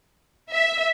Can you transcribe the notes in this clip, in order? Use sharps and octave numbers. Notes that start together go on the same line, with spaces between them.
E5